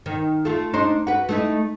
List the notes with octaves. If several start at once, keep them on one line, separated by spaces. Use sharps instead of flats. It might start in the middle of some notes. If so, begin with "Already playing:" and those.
D#3
A3 F4
D4 D#4 C5
F#4 B4
A3 D#4 E4